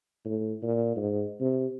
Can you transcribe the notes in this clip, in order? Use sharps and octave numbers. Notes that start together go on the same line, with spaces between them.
A2
A#2
G#2
C3